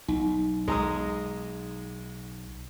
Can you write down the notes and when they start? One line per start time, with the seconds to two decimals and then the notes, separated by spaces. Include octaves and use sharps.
0.08 B1 D#4
0.68 B1 G#3 A#5 D#6